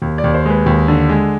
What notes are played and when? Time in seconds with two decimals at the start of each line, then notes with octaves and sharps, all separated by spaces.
0.02 D#2
0.18 D5
0.24 D#2
0.34 C5
0.46 G#3 B4
0.66 D#2
0.88 D3
1.09 G#3